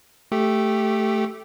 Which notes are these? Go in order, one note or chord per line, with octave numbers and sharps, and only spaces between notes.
A3 G4